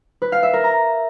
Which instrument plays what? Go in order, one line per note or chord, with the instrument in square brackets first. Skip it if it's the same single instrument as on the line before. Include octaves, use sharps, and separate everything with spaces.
[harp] B4
F5
E5
A#4
A#5